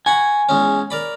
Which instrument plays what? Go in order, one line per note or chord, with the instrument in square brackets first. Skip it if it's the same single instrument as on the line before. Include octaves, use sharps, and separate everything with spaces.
[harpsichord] F#4 F#5 B5 [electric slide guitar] G#5
[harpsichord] E2 G#3 C#4
A#4 D5 B5